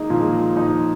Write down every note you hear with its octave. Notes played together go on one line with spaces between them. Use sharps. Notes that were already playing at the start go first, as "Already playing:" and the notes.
Already playing: D#3 G#3 A#3 D#4
A#2 F3
G#3
F3
F3 D#4